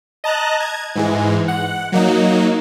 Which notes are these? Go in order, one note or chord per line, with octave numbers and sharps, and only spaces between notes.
D#5 A5 A#5 F#6
G#6
G#2 E3 G#3
F#5
F#3 A#3 D#4